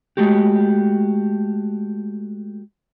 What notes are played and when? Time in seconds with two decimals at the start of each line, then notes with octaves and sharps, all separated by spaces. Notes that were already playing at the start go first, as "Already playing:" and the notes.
0.17 G#3 A3 F#4 G4